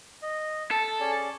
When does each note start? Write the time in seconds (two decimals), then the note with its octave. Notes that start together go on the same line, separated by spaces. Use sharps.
0.22 D#5
0.71 A4 A5
1.00 C#4 G#4 D5